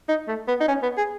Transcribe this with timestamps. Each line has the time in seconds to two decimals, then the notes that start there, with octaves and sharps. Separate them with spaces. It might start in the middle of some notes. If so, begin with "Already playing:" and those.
0.09 D#4
0.28 A3
0.48 B3
0.61 D#4
0.68 C#4
0.83 B3
0.97 G#4